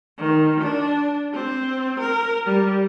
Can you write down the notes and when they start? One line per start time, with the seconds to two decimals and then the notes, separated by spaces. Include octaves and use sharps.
0.18 D#3
0.61 D4
1.34 C4
2.00 A#4
2.46 G3